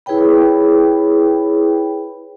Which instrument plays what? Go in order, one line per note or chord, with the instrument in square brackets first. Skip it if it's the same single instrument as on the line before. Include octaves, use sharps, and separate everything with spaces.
[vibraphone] E4 G#4 B4 C#5 G5 B5